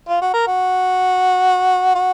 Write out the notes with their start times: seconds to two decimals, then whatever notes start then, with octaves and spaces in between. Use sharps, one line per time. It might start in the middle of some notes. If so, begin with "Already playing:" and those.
0.09 F4
0.22 F#4
0.33 A#4
0.47 F#4
1.95 F#4